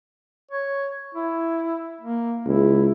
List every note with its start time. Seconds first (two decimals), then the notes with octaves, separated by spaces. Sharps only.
0.51 C#5
1.15 E4
2.01 A#3
2.46 C#2 E4